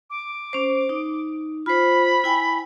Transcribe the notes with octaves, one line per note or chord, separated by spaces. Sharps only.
D6
C#4 C5
D#4
F4 C5 B5
E4 G5 G#5